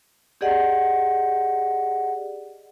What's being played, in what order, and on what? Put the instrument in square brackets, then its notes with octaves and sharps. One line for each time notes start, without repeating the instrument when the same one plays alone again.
[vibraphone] G4 G#4 D5 D#5 F#5